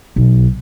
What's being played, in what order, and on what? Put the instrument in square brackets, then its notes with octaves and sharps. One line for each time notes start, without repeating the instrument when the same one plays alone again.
[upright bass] B1